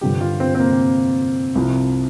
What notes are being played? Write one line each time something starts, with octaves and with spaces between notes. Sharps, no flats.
G2 D3 F3 G4
F4
C4
C4
A#3
C2 C3 F3